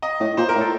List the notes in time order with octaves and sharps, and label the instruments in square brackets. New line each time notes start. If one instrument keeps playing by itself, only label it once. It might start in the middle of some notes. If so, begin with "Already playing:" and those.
[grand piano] D#5
[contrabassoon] A2
[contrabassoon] A#2 [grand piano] C5
[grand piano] A#4
[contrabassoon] A2
[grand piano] A4